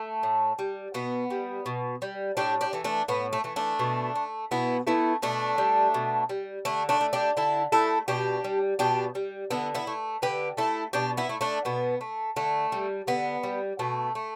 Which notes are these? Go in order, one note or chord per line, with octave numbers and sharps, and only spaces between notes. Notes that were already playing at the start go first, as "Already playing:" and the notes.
Already playing: A3
A2
G3
B2 B3
G3
B2
G3
A2 D4 G4
D4 G4
E3 A3
A3 D4
A2 B3
A3
E3 A3
A3 D4
B2
A3
B2 B3 E4
A3 B3 E4
B2 A3 D4
G3
B2
G3
D3 A3 D4
A3 D4
A3
D4 G4
D3 E4 A4
A3 E4 A4
B2 D4 G4
G3
B2 D4 G4
G3
D3 B3 E4
B3 E4
A3
D3 G4 B4
A3 E4 A4
B2 D4 G4
B3 E4
A3
A3 D4
B2 B3
A3
D3 A3
G3
D3 B3
G3
B2 A3
A3